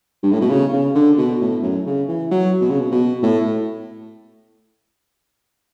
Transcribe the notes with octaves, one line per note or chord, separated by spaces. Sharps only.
G2
A2
B2
C#3
C#3
D3
B2
A2
F#2
C#3
E3
F#3
B2
C#3
B2
B2
A2